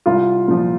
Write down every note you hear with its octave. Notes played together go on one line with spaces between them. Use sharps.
C2 F4
A#2 F3